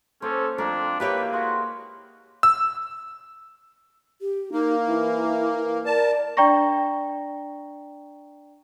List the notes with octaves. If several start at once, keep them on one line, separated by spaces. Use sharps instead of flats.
A#3 C#4 A4 C5 D6
F2 A3 D4 A#4
A#3 E4 G4 B4 C#5 D#5 E5 G5
G#3 F#4 D#5 F5
E6
G4
A#3 D#4
E3 E4
A#4 D5 A5
D4 D5 G5 A#5 C#6 A#6